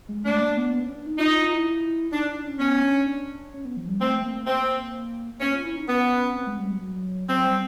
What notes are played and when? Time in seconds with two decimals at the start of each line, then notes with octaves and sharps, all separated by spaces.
0.09 G#3
0.25 A3 D4
0.40 A#3
0.56 B3
0.72 B3
0.83 C#4
0.95 D4
1.06 D#4
1.19 D#4 F4
1.30 F4
1.42 F4
1.54 E4
2.12 D4 D#4
2.28 D4
2.44 C#4
2.59 B3 C#4
2.83 D4
3.06 D4
3.54 C#4
3.65 B3
3.77 F3
3.88 G3
4.00 A3 C4
4.24 A#3
4.47 C4
5.41 B3 C#4
5.53 F4
5.64 E4
5.76 D#4
5.87 B3 C#4
6.35 C4
6.47 G#3
6.58 G3
6.71 F#3
6.82 F#3
7.29 F#3 C4
7.45 G3